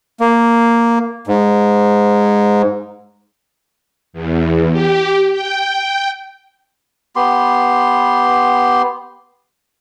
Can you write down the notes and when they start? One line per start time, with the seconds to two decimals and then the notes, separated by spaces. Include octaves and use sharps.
0.20 A#3
1.27 G#2
4.13 E2
4.72 G4
5.32 G5
7.16 B3 G4 C6